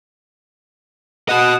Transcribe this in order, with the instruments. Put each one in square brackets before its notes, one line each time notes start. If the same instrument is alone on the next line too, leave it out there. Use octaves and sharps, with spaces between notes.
[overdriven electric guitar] F#4 D#5 [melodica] F#5 D#6